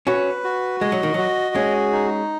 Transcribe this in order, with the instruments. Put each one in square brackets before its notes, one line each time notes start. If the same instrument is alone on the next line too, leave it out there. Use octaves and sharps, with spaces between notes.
[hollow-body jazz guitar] C#4 F#4 [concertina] B4
[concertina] F#4
[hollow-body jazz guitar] G#3 [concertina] D#5
[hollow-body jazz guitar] F#3
D#3
[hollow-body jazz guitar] F#3 [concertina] F#4
[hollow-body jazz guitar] G#3 C#4 [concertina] G#4
[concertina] D#4